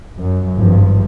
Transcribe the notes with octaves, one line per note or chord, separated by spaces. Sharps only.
F#2
G#1 G2 F3